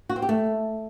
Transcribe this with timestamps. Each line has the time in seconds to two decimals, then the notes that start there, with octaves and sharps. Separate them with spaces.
0.09 F#4
0.16 C4
0.22 G4
0.29 A3